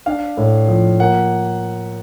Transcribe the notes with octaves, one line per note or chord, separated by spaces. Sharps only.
D4 F5
A2
F3
A#3 F#5